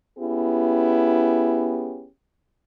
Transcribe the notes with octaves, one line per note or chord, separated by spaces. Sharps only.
B3 C#4 E4 G4 G#4